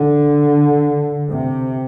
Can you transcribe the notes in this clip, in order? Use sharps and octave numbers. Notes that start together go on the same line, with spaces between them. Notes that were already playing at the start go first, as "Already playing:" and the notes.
Already playing: D3
C3